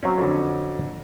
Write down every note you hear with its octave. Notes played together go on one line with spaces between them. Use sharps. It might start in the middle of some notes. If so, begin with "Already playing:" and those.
F#3 C4 C#4
F2 D3